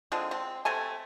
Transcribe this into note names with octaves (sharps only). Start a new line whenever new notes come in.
D3 F3 G#3 C4
C4
C3 A3 A4 G#5